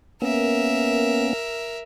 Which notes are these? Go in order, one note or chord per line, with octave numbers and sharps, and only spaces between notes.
A#3 B3 C#4 A#4 E5